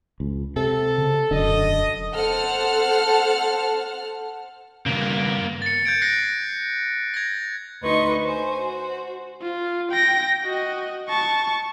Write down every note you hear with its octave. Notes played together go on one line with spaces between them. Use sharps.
C#2
C3 A4
C#3
E1 F#2 D3 D#5
A4 C5 F#5 A5 F6
G2 C#3 A#3 B3
A6 C#7
G6 G#6 D7
F#6 A#6 C7 D7
G#6 A#6
D2 D#4 B4 D#5 C6 C#6
C5 G#5
F#4 C5
F4
G5 A#6
F#4 D#5
A5 C#6